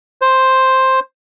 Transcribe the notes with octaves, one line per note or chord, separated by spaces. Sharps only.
C5